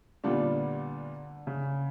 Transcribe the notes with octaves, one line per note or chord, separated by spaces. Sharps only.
A#2 D3 G3 B3 D4 F4
C#3